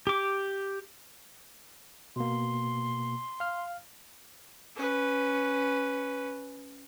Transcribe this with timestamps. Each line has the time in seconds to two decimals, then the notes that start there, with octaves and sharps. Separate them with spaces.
0.07 G4 D6
2.16 B2 A#3 C6
3.40 F5 F6
4.76 C#4 B4